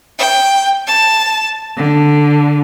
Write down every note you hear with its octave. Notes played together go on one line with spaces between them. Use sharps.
G5
A5
D3